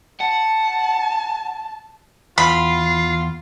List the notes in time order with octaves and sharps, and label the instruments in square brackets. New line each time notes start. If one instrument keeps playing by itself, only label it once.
[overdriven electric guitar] F#5 [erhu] A5
[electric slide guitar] E2 [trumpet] F4 [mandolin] B5 [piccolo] C7